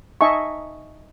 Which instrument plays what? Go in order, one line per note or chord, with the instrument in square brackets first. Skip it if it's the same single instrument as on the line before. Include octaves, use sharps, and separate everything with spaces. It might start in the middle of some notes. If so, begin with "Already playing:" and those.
[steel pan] D#4 D#5 E5 G#5 A5 C#6